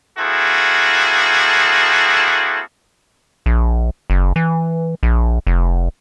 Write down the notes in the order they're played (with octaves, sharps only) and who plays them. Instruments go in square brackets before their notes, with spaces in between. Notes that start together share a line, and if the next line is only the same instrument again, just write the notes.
[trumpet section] A#3 C4 E4 F#4 G#4 A4
[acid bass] A#1
F#1
E3
A#1
F1